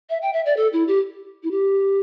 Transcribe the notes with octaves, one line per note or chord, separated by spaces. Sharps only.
E5
G5
E5
D5
A4
E4
G4
E4
G4